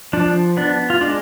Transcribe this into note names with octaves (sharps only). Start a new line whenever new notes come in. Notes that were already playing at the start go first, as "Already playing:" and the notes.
F3 D4
B3 D4
F4
G#3 D4